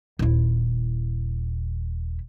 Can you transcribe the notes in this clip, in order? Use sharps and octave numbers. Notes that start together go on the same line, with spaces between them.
D#1 E4